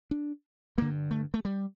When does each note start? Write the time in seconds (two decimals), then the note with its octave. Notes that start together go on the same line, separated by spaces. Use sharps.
0.11 D4
0.78 G2 D3 A#3
1.11 A3
1.34 A3
1.45 G3